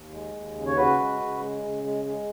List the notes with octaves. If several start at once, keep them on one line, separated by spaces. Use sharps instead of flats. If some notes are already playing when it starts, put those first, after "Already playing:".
Already playing: D#2
G#3
D#2
C#3
C#5
C#3 F#4 B4
G#3
C#3
G#3
C#3
G#3
G#3